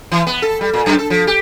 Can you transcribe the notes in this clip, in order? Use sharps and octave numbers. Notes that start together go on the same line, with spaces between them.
E3
B3
A4
G3
A#2
F#2
A4
F3
G4